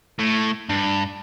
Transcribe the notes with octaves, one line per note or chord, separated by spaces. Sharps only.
A2
G2